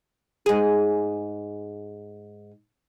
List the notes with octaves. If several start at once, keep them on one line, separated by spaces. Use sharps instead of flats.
G#2 G#4